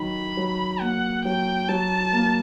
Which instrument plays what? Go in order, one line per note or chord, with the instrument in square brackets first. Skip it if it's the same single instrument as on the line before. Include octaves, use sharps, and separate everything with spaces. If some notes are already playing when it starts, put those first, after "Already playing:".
Already playing: [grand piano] D#3 F#3 [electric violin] B5
[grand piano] F#3
[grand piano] A#3 [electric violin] F#5
[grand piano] F#3 [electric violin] G5
[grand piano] F#3 [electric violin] A5
[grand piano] A#3